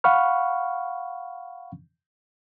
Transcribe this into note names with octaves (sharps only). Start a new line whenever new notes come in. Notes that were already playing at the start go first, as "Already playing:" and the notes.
F5 F#5 B5 C#6 F6